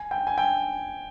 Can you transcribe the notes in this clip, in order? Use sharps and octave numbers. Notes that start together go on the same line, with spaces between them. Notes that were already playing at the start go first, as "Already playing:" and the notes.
Already playing: G#5
G5
G#5
G5